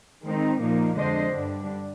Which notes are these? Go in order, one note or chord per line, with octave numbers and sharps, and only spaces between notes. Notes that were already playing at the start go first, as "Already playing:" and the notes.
D#3 G#3 C4 D#4
A#2 F3 A#3 D#4
F2 D3 G#3 D4 C5 D#5
G2 D3 G3 D4